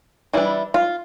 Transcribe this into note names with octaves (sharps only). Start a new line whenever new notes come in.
E3 G3 D4 E4
F4